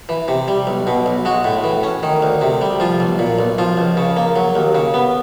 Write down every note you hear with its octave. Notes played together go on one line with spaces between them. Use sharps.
E3
C3
G3
B1
B2
B1
G#3 F#4
A2
E3
C#4
D#3
D2
C3
G3
F3 F4
B1
A#2
B1
F3 F4
C#2
C#3
A#3
F#3
D#2
C#3
B3